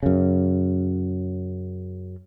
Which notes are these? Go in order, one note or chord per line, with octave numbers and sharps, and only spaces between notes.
F#2 C#3